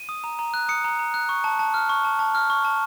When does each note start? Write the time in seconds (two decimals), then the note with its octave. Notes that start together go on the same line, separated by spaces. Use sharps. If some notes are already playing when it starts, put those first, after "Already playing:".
Already playing: D#7
0.09 D#6
0.24 A#5
0.39 A#5
0.54 F#6
0.69 D#6 C#7
0.84 A#5
0.99 A#5
1.14 F#6
1.29 C#6
1.44 A5
1.59 A5
1.74 F6
1.89 C#6
2.04 A5
2.19 A5
2.35 F6
2.50 C#6
2.65 A5